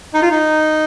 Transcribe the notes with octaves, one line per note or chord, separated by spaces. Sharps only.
D#4
F4
D#4